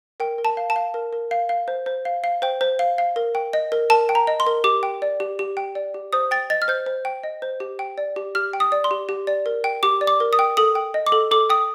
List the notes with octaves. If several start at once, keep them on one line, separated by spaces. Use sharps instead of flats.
A#4 G5
A#4
A5
F5
A5
F5
A#4
A#4
F5
F5
C5
C5
F5
F5
C5 G5
C5
F5
F5
A#4
G5
D#5
A#4
A#4 A5
G5
A#5
D#5
C6
A#4
G4 D6
G5
D5
G4
G4
G5
D5
G4
C5 D#6
G5 A6
D#5 A6
F6
C5 G6
C5
G5
D#5
C5
G4
G5
D5
G4
G4 F6
G5
D#6
D5
C6
G4
G4
D5
A#4
G5
G4 D6
D5
D6
A#4
D#6
G5
A4 D#6
G5
D#5
D6
A4
A4 D6
G5 D#6